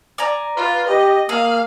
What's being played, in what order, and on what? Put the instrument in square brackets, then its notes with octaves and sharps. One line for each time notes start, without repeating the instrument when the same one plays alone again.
[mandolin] D5 G#5 A#5
[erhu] F4 [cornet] B4
[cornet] G4 [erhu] D#5
[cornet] A#3 [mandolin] G#4 [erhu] F5